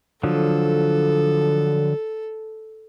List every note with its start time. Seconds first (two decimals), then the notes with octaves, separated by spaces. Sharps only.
0.23 D3 F3 F#3 A4